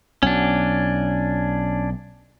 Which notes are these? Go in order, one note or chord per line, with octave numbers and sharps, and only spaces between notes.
B1 C#4 D4